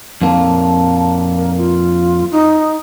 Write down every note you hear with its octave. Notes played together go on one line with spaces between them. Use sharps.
F2 A#3 A5
A#4
F4
D#4